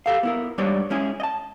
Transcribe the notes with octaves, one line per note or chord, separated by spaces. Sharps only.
G4 A4 F5
B3 E4 A#4
G#2 G3 D4 B4 C#5 D5
G#3 C#4 E4 G#4
D#5 A5